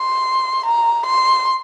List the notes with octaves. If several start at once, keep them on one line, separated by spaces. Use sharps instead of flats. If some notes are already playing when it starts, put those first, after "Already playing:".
Already playing: C6
A#5
C6